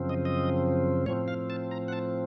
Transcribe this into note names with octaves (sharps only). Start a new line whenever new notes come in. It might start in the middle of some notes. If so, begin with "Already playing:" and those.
Already playing: F#2 C#3 F3 C4
D#5
D#5
A2 F3 C4 C#5
F5
A5
A#5
F#5
A5